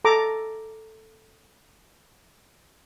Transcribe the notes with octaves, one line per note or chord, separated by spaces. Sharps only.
A4 A#5 D6